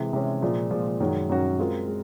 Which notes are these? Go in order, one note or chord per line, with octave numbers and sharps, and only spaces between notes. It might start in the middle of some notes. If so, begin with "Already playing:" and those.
Already playing: C3 E3 G#3
C3 E3 G#3 C#4
A#2 F3 G#3
A#2 F3 G#3
F#2 D#3 G#3 C#4 F#4
F#2 D#3 G#3 C#4 F#4
G#3 C4 F4 A#4
G#3